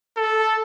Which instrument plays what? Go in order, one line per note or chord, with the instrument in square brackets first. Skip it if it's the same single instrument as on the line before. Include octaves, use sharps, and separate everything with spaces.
[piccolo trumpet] A4